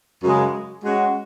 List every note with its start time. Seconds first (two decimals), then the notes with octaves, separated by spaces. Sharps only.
0.22 F#2 C#3 G#3
0.84 G#3 C#4 F#4